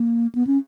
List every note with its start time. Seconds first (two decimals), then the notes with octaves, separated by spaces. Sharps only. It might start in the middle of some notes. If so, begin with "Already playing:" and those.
Already playing: A#3
0.35 B3
0.47 C#4